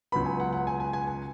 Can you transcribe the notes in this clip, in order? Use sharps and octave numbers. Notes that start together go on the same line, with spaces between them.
C#2 C#3 F#3 B3 B5
G#5
F#5
F#5
G#5
G#5
G#5
G#5